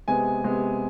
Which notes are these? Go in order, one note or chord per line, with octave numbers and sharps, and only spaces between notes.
C3 G#3 B3 G#5
C3 G#3 B3